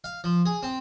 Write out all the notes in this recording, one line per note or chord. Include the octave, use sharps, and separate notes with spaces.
F5
F3
G#4
C4